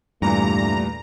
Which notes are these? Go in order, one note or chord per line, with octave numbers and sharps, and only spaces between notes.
E2 G2 A#2 E3 G3 A3 A#5